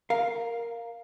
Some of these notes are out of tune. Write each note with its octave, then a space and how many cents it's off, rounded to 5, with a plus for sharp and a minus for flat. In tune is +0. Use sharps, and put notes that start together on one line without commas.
A#4 +0 F5 +0